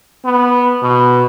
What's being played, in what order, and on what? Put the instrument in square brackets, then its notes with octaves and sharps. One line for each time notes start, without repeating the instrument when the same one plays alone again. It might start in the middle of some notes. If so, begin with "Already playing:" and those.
[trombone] B3
B2